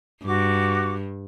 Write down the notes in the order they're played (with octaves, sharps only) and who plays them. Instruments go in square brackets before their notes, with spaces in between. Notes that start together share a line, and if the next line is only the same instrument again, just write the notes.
[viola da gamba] G2 [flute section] F#4 D6